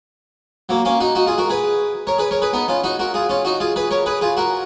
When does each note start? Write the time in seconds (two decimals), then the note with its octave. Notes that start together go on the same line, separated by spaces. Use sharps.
0.69 F#3 A#3
0.85 A#3 C#4
1.00 D#4 F#4
1.15 D#4 F#4
1.26 F4 G#4
1.38 F#4 A#4
1.49 G#4 B4
2.07 A#4 C#5
2.18 G#4 B4
2.31 A#4 C#5
2.42 G#4 B4
2.53 B3 D#4
2.68 C#4 F4
2.84 D#4 F#4
2.99 F#4 A#4
3.14 F4 G#4
3.29 C#4 F4
3.45 D#4 F#4
3.60 F4 G#4
3.76 G#4 B4
3.91 A#4 C#5
4.06 G#4 B4
4.21 F4 G#4
4.37 F#4 A#4